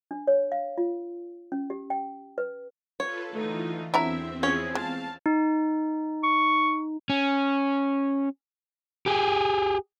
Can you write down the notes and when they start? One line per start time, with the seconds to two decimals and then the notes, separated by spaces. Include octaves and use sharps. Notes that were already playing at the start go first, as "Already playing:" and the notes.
0.11 D4
0.27 C#5
0.52 F5
0.78 F4
1.52 C#4
1.70 G4
1.90 G5
2.38 B4
3.00 F4 A4 B4 C#5
3.31 D3 E3 A3 D#4 F4
3.94 E2 D3 F#3 C4 E4 E5 A#5
4.43 F3 C#4 E4 G#4 C#5
4.75 G#3 F5 A5
5.26 D#4
6.24 C#6
7.10 C#4
9.06 G4 G#4